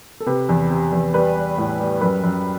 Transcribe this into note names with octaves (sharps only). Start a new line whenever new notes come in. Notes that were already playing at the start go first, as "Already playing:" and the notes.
A4
C3 B4
E2
C3
E2
G3 B4
G3
A2
G3
F#2 B4
F#2